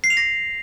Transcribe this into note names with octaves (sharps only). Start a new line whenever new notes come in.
C7
F7
A#6